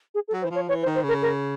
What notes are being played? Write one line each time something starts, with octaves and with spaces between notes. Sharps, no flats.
G#4
A4
F#3
C5
E3
F3 C#5
E3 C#5
C5
D#3
C5
C#3 A#4
A#4